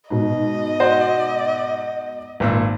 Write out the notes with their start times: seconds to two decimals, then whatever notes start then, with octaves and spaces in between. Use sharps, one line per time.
0.10 G#2 B2 D#5
0.80 F#4 C5
2.40 G#1 A#2 E6